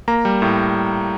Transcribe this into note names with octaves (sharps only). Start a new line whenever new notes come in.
A#3 A#5
G3
A2